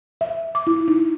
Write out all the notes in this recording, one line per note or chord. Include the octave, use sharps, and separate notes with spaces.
E5
D6
E4
D#4